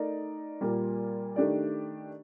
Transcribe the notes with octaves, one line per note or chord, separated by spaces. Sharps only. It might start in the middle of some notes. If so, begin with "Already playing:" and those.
Already playing: A3 D#4 A#4 D5
A#2 G3 A#3 F4
D#3 A3 D4 G4 D5